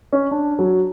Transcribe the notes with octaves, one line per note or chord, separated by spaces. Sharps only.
C#4
D4
F#3